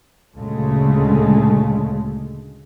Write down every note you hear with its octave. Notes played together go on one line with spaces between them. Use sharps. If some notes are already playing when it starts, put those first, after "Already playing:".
D2 A#2 C#3 G#3 A3